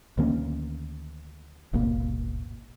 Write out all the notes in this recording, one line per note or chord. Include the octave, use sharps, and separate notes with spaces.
D2 D#3 A#3 C#4
D#1 G#1 B2 A#3